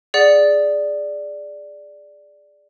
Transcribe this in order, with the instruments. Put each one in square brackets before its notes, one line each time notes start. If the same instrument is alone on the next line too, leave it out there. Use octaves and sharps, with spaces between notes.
[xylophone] G#4 D5 F#5